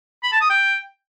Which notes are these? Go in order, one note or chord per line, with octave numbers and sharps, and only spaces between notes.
B5
A5
D#6
G5